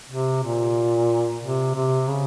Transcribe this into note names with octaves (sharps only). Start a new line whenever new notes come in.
C3
A#2
C3
C3
C#3